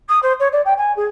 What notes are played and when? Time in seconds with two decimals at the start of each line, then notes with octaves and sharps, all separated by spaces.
0.09 D#6
0.22 C5
0.39 C#5
0.52 D5
0.65 G5
0.77 G#5
0.96 G#4